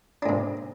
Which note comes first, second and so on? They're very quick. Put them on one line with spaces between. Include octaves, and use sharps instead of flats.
D4 G#2 C3